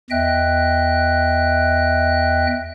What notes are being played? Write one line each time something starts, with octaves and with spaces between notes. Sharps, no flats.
E2 D#5 E5 G5 F#6